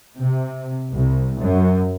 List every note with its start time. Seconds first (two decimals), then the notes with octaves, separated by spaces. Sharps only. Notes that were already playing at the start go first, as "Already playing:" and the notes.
0.19 C3
0.90 C2
1.38 F#2